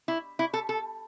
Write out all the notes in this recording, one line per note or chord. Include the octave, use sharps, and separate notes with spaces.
E4
E4
A4
A4